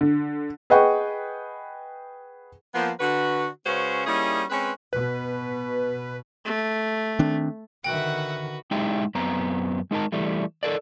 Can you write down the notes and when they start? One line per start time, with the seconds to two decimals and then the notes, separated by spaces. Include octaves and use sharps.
0.01 D3
0.70 G#4 B4 D#5 F#5 G5 C#6
2.74 F3 A#3 B3
3.00 D3 F#4 B4
3.65 C#3 G#3 C#4 F#4 B4 C5
4.07 G3 A#3 C#4 D#4 E4 G#4
4.50 G#3 C4 C#4 B4
4.93 B2 B4
6.45 A3
7.19 D#3 C4 D4
7.84 D3 D#3 F#4 B4 E5 F#5 G5
8.71 G#3 D#4 E4 G4 G5
9.15 F#2 B3 C4 A#5
9.91 G#3 D#4 A#4 A5
10.12 E3 G3 A3
10.63 A4 A#4 D5